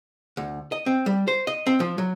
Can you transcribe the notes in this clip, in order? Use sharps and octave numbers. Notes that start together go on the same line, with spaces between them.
D2
D#5
C4
G3
C5
D#5
C4
F3
F#3